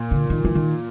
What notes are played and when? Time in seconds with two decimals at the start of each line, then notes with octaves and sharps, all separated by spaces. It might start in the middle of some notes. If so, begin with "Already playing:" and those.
Already playing: A#2
0.11 D3
0.30 D#3
0.45 E3
0.55 D#3